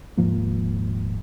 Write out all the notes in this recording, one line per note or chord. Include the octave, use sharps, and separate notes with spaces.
D#1 G#2 F3 A#3